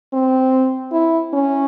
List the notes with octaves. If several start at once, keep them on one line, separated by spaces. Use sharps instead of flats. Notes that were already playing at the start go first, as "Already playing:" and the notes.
C4
E4
C#4